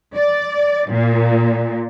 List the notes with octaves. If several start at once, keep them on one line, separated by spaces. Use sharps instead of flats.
D5
A#2